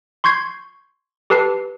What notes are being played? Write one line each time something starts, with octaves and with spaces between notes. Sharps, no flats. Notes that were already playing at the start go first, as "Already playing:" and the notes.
C6 C#6 G6 G#6 C7
G4 A4 B4 A5 C7